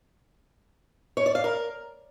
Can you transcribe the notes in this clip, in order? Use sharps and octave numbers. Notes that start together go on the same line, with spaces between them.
C#5
D5
F5
A#4